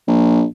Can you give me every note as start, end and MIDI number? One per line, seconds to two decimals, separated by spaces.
0.08 0.44 34